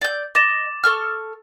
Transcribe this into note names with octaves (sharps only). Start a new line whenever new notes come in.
D5 G6
D#5 D6 A6 E7
A4 C#6 F6